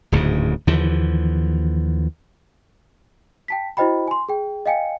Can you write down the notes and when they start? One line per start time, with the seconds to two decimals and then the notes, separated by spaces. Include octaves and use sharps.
0.12 D1 D2 G#2 C#3
0.67 D#2 D3 E3 F3
3.48 G5 A5 B6
3.77 E4 F#4 C5 D#5 G5 B5
4.08 G#5 C6
4.29 G#4 G5
4.66 D#5 F5 G5 G#5 C#7